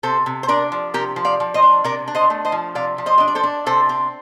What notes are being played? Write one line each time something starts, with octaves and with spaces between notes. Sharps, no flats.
C3 A4 C5
C3
C5
D4 A#4 D5
F3
C3 G4 A#4
F3
D5 F5
F3
C5 D#5
D4
C3 A#4 D5
D4
C5 D#5
A3
C5 D#5
F3
C3 D5 F5
F3
C5 D#5
D4 D#5
D5
A4 C5
D4
C3 A4 C5
C4